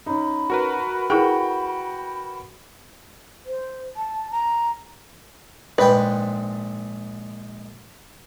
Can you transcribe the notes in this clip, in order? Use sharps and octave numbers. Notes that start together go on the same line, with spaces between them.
C#4 D#4 B5
F#4 A#4 B4
E4 F#4 G#4 A#4 B4 G5
C5
A5
A#5
A#1 G#2 B4 G5